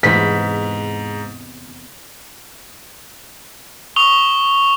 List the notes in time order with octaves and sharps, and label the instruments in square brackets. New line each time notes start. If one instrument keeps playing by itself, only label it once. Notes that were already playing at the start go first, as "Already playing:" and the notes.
[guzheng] E2 C3 B4 [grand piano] G#2 [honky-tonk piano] B6
[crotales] C#6 D#6 F7 G7